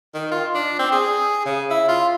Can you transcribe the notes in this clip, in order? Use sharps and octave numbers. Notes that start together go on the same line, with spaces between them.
D#3
F4
D4
C4
G#4
C#3
E4
F4